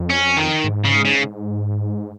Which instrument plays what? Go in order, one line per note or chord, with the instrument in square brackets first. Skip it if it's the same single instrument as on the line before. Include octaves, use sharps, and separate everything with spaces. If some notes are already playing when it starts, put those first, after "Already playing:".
Already playing: [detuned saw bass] F2
[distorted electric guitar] C#4
D#3
[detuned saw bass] G#2
[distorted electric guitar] C#3
C#3